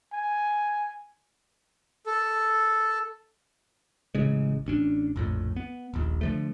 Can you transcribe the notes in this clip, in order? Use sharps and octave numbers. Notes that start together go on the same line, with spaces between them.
G#5
A4
A1 C#3 G#3
A1 C#4 D4
A#1 F2 A2
B3
D#1 A#1
D3 F3 A3